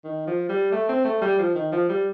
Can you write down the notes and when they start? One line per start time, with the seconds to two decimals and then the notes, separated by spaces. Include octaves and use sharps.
0.04 D#3
0.27 F3
0.49 G3
0.72 A3
0.89 C4
1.04 A3
1.21 G3
1.39 F3
1.55 D#3
1.72 F3
1.89 G3